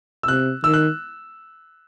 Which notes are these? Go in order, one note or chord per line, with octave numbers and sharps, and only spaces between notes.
E6
C3 F#6
D#3 E6
F#6